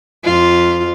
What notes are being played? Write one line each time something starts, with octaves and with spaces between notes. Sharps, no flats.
F2 F4